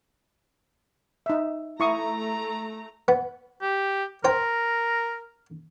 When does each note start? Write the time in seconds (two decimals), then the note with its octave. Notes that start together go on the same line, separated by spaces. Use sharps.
1.26 D#4 E5
1.80 A3 E4 A#5 C#6 D#6
3.08 B3
3.62 G4
4.25 A#4 C5 G5